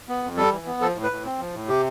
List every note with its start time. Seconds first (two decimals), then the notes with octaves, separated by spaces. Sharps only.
0.09 B3
0.23 F2
0.37 G3 A4
0.52 E3
0.66 B3
0.81 F3 A4
0.95 A2
1.03 B4
1.11 A2
1.25 C4
1.39 F3
1.54 A2
1.68 C3 G4